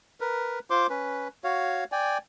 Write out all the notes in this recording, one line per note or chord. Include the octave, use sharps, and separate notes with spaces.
A#4 B4
F4 C5 C6 D6
C#4 B4
F#4 C#5 F5
D5 G5 G#5